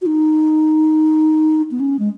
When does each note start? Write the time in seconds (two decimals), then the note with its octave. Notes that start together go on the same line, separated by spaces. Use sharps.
0.02 F#4
0.06 D#4
1.71 B3
1.80 C#4
1.99 G#3